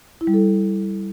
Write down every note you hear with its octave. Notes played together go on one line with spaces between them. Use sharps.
E4
G3
A4